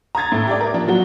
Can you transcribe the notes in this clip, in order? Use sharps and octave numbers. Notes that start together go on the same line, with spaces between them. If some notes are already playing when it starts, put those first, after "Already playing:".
A#5 D#6 G#6 A6
A2
G4 D5
A#4
F3 D4
F3 F#3 F#4